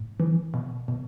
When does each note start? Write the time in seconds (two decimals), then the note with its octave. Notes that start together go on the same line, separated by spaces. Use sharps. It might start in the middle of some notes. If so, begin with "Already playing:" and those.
Already playing: A2
0.20 E3
0.54 B2
0.88 B2